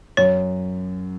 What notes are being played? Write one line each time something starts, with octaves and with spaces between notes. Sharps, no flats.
F#2 C#5